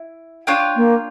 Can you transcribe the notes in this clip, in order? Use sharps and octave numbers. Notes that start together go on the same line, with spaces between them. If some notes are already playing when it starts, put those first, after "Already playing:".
Already playing: E4
D4 F4 C#5 G5
A#3